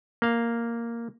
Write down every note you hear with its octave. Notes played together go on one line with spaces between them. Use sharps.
A#3 F5